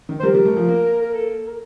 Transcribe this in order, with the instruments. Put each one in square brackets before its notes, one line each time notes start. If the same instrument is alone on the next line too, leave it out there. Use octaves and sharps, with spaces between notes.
[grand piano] D#3
[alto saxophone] C5
[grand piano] G3 [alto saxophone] A#4
[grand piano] G3
A3
F3
A#3
[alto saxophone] A#4
A4
A#4